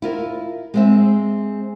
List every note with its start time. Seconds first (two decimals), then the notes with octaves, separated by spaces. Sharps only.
0.02 E4 F4 A#4
0.74 G#3 C4 E5